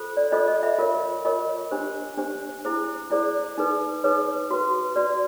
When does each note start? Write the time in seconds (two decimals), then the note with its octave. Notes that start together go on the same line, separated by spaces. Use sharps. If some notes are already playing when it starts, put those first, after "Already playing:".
Already playing: F4 A4 C5
0.17 D5
0.32 F4 A4 C5 D#5
0.47 D#5
0.63 E5
0.78 F4 A#4 C#5
1.25 F4 A#4 C#5 D#5
1.71 D4 G4 C5
2.18 D4 G4 C5
2.65 E4 G#4 C5
3.11 E4 G#4 C5 D5
3.58 D#4 G#4 B4
4.04 D#4 G#4 B4 C#5
4.51 F#4 B4
4.96 F#4 B4 D5